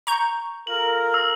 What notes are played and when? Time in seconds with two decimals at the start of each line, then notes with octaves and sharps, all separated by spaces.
0.07 A#5 C#6 G6
0.67 F4 A4 A#4 F#7
1.14 E6